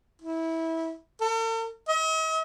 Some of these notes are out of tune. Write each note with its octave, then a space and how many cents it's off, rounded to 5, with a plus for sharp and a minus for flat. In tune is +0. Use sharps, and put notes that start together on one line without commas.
E4 -20
A4 +45
D#5 +45